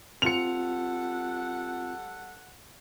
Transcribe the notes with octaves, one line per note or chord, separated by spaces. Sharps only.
G3 C4 F4 A4 F#5 C#7 F7